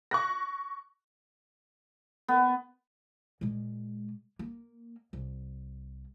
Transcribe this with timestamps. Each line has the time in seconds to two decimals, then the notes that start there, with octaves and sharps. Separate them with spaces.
0.11 C#6 F#6 A#6
2.28 B3
3.41 A#2 G#3
4.39 A#3
5.13 C2